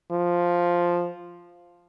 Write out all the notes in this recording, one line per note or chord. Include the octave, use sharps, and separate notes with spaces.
F3